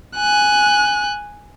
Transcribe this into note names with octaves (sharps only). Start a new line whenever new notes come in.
G#5 F#6